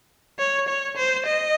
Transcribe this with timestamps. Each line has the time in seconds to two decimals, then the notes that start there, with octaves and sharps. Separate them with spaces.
0.39 C#5
0.68 C#5
0.97 C5
1.26 D#5